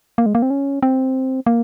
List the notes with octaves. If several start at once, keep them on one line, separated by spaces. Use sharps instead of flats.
A#3
G#3
A#3
C4
C#4
C4
A#3